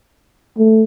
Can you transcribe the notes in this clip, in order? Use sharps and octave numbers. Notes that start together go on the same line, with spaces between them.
A3